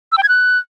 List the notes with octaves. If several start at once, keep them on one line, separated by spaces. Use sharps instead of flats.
E6
G5
G#6
F#6